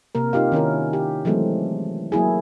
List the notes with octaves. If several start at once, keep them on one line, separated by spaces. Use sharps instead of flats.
C3 A#3 A#4
D#4 F4 G4 F5
D#3 C#4 E4 A#4
G4
E3 F#3 G#3 A3 C4
F#3 A#3 E4 G#4